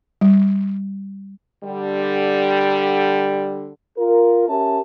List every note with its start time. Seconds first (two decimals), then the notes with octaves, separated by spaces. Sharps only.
0.21 G3
1.64 D3 G3
3.98 F4 A#4
4.49 C#4 G4 A#4 E5 A5